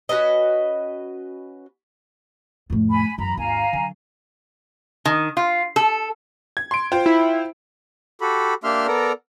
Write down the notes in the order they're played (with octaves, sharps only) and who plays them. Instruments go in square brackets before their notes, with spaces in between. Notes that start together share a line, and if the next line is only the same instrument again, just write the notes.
[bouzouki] C#4 F#4 B4 D#5
[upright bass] F2 A2
[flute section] G#5 B5
[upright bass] F#2 E3 [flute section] A#5 B5
[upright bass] G#1 D#2 [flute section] F5 G#5 A#5
[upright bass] D3 F#3
[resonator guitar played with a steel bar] D#3
F4
A4
[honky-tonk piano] G#6
C6 D7
F4 C5 G5
[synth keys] E4
[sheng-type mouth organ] F#4 G4 A4 B5
A#3 D4 G4 E5 C6 F6
B3 A4 A#4 D5 A#5